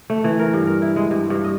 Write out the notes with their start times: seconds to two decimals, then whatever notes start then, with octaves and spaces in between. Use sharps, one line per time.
0.10 A3
0.24 E3
0.39 A#4
0.54 G2
0.67 A#4
0.82 E4
0.96 G#3
1.11 G2
1.30 G2
1.44 D#5